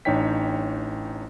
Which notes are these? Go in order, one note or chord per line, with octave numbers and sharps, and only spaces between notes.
A1 D4 D#4 C#5 G5 B6